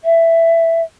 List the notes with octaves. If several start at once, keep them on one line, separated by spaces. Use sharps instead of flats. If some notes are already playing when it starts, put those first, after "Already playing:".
E5